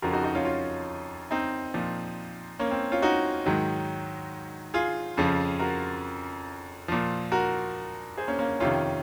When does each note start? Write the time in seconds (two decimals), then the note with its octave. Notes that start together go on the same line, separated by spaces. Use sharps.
0.02 F2 C#3 F3 F#4 A#4
0.13 D#4 F#4
0.24 D#4 F#4
0.35 C#4 F4
0.45 C#4 F4
1.31 C4 D#4
1.74 A#2 F3
2.59 A#3 C#4
2.71 C4
2.92 C#4 F4
3.02 D#4 F#4
3.46 G#2 D#3 F#3
4.74 F4 G#4
5.17 F2 C#3 F3
5.60 F#4 A#4
6.88 A#2 F3
7.32 F#4 A#4
8.17 G#4 C5
8.28 A#3 C#4
8.39 A#3 C#4
8.60 F2 C3 D#3 C#4 F4